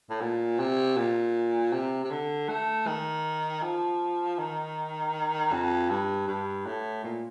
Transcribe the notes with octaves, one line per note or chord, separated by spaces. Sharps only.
A2
A#2
C3
A#2
C3
C3
D3
A3
D#3
F3
D#3
F2
G2
G2
A2
A#2